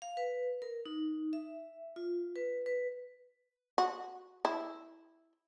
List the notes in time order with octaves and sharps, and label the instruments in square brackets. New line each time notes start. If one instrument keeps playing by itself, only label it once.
[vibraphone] F5
B4
A#4
D#4
E5
F4
B4
B4
[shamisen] F#4
E4